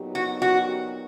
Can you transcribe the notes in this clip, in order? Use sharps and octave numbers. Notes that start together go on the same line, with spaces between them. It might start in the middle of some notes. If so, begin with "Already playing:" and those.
Already playing: A#2 F#3 B3 D#4 G4
F#4
F#4